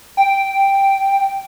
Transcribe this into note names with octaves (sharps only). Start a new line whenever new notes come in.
G5